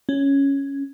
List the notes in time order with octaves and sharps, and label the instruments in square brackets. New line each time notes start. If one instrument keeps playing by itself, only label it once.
[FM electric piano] C#4